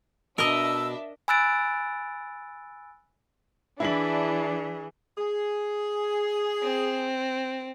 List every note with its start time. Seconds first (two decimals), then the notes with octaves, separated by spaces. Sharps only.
0.38 B2 D4 A#4 D#5 E5 E6
1.28 G#5 B5 E6 F#6 A6 D7
3.80 E3 D4 E4 G#4 F#7
5.17 G#4
6.62 C4